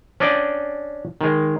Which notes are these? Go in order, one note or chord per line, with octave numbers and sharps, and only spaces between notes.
C#4 D4 D5 D#5 G5
D#3 G#3